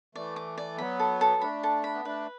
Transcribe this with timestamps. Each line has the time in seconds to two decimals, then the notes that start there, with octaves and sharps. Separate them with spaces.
0.15 E3 A3 D5
0.36 D6
0.58 D5
0.78 F#3 B3 B5
0.99 A4
1.21 A4
1.42 A3 D4 B5
1.63 A4
1.84 B5
1.94 B3
2.05 A3 D4 B4